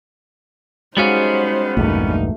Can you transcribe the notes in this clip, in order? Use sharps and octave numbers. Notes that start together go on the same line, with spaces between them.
G3 G#3 B3 C#4 D#4 F#4 C5 F5
A#1 E2 G2 A3 A#3 D#4